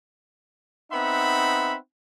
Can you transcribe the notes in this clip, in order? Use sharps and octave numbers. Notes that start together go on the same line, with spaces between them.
B3 C4 D#4 E5 F#5 B5